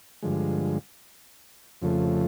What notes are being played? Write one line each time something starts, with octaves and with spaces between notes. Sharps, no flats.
G2 D3 F3 G#3
F2 C#3 F3 A3